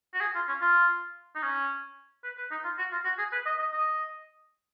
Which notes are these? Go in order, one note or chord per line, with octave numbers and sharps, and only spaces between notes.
F#4
G#4
F4
C#4
F4
D#4
C#4
B4
B4
D#4
F4
F#4
F4
F#4
G#4
B4
D#5
D#5
D#5